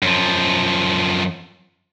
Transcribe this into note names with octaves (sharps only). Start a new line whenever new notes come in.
F#2 F3